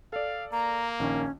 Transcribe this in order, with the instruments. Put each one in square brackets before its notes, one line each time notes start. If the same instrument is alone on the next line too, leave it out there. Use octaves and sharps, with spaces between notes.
[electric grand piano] A4 D5 [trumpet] F5
[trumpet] A#3 [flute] A#5
[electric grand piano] A#1 D#3 [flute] C#4